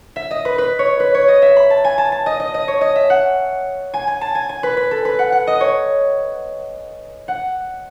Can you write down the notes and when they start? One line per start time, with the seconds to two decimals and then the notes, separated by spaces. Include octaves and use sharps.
0.16 E5
0.31 D#5
0.45 B4
0.58 B4
0.79 C#5
1.00 B4
1.14 C#5
1.28 D#5
1.42 E5
1.57 B5
1.70 A5
1.84 G#5
1.98 A5
2.12 A5
2.26 D#5
2.40 D#5
2.54 D#5
2.68 C#5
2.81 D#5
2.96 E5
3.10 F#5
3.94 G#5
4.08 G#5
4.21 A5
4.35 G#5
4.49 G#5
4.63 B4
4.77 B4
4.91 A4
5.05 B4
5.19 F#5
5.32 F#5
5.47 D#5
5.61 C#5
7.28 F#5